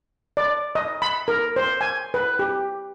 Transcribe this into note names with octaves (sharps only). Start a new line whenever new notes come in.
D5
D#5
B5
A#4
C5
G#5
B4
G4